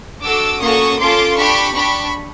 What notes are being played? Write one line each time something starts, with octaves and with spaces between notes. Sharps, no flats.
D4 F#4 A4 D6 E6
A#3 C#4 F#4 A4 C#6 D#6
C#4 F4 A4 C6 D6
D4 G4 B5 C#6
D4 G4 B5 C#6